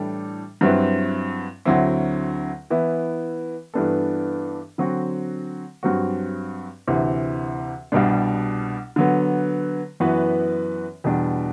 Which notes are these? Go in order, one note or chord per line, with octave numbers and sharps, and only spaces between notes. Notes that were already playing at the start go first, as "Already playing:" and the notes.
Already playing: A2 E3 G3 D4 A4
G2 F#3 C4 E4 B4
D2 D3 F#3 C4 E4
E3 B3 E4
G2 E3 B3 D4 A4
D3 F#3 C4 F#4
G2 F#3 C4 F#4
D2 C3 E3
C2 B2 G3 D4
D3 F#3 B3
F#2 E3 B3 F#4 B4
E2 B2 G3 D4